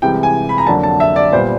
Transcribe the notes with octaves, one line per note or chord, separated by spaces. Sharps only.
C2 C3 E3 G#3 G5
G#5
B5
A#5
F2 D3 F#3 A#3 D4 A5
A5
E5
D5
A#2 G3 B3 C5